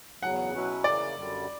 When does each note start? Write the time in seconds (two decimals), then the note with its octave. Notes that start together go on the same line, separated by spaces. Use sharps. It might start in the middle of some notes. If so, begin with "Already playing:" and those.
0.22 E2 C#3 F#3 F#5
0.53 B2 F#3 C#4 E4 B4
0.84 C#3 E3 A#3 D5
1.15 F#2 D3 G3